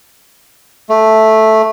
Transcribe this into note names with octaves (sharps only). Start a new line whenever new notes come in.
A3